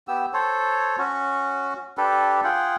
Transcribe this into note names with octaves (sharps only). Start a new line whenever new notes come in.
B3 G4 E6
A4 C5 C#5
C#4 F#4
D4 G4 A4 B4
F4 G#4 F#5 G5